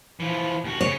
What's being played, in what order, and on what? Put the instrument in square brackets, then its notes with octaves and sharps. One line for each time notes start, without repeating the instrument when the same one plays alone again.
[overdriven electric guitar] E3 F3
D#2 F#4
[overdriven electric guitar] C#3 [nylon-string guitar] C#5